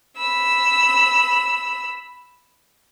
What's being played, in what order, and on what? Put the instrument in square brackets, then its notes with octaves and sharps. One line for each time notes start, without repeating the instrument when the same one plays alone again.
[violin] B5 E6